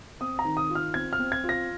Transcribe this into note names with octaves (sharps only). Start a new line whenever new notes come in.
C4 D#6
A#5
D#3
D#6
F4
F6
C4 G#6
F6
C4
G#6
F4
A#6